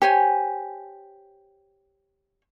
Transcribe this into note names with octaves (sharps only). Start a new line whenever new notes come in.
G4 C5 C#5 G#5